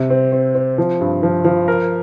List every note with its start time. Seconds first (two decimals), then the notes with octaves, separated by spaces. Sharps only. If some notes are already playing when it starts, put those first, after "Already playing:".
Already playing: C3
0.10 C4
0.32 C4
0.55 C4
0.78 F3
1.01 G2
1.23 F3
1.45 F3
1.68 A#4